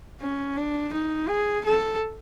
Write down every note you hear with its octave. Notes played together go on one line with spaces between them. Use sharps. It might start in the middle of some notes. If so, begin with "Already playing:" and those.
C#4
D4
D#4
G#4
A4